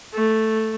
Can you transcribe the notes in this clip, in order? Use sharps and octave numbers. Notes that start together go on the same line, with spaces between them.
A3